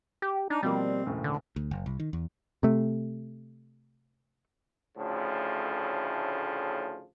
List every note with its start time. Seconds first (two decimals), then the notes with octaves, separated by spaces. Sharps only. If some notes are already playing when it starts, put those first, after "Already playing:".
0.22 G4
0.50 D4 D#4
0.63 B2 F3 G3 A#3 C4
1.06 E1 A2 C#3
1.24 D3
1.56 D2
1.71 F#1
1.86 C2
2.00 D#3
2.13 E2
2.63 C3 A3
4.97 D2 A2 C#3 F3